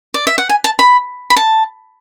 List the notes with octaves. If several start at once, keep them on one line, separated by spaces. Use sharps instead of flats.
D5
E5
F#5
G#5
A5
B5
B5
A5